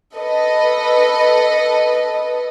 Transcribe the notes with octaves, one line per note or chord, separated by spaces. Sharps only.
A4 B4 D#5